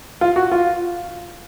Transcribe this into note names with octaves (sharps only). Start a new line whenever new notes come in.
F4
F#4
F4